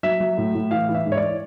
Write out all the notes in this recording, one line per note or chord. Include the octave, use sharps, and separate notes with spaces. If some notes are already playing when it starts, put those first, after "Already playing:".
F#3 E5
F#3
A2
A2
E3 F5
E3
E5
G#2
C#5
D5